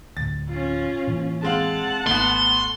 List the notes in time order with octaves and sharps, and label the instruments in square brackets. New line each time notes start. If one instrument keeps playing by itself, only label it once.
[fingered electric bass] D2 A2 [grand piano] A6
[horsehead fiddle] C#4 F4
[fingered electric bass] A2 E3 A#3
[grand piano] G#3 C4 F5 [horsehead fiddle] F#5 A5
[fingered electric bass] G#1 [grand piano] A3 B3 [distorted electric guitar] C6